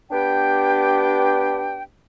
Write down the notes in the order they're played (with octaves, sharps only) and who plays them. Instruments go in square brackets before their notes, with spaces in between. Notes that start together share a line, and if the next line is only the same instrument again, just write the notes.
[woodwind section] B3 D4 G4 B4 G5